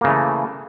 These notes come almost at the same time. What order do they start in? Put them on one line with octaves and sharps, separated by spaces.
A#3 C#3 E3 A3